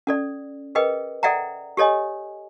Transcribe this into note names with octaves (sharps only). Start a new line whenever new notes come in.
C#4 A4 D5
G#4 A#4 B4 D#5 G5
A4 D5 E5 F#5 G5 A#5
G4 A4 C#5 D#5 G#5